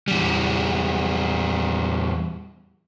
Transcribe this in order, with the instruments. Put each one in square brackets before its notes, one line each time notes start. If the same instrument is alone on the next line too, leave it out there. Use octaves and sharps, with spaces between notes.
[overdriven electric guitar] E2 G3